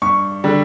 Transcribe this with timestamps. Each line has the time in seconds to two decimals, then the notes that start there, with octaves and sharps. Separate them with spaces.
0.02 G2 C#6
0.44 D3 G3